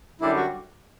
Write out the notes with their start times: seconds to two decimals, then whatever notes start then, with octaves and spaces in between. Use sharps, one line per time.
0.21 F#2 D3 G3 E4
0.36 F#4